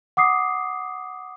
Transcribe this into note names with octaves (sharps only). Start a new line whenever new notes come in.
F#5 D6 D#6 C7